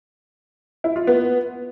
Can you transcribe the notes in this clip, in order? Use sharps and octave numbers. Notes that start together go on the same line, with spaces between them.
E4
F4
B3